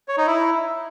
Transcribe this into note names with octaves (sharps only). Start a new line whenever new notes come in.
C#5
D#4
E4